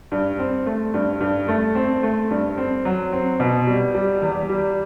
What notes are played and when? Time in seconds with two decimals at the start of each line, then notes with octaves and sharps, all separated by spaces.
0.12 G2
0.39 C4
0.66 A3
0.94 G2
1.21 G2
1.48 A3
1.75 C4
2.03 A3
2.30 G2
2.58 C4
2.85 F#3
3.12 C4
3.40 B2
3.67 G3
3.95 G3
4.22 E2
4.49 G3